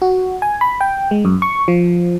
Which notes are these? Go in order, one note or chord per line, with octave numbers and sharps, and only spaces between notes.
F#4
G#5
B5
G5
G#3
F#2
C#6
F3